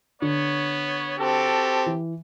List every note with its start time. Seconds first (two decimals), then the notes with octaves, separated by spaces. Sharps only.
0.22 D3 B3 C#5
1.18 C4 F#4 G4 A4 A5
1.86 E3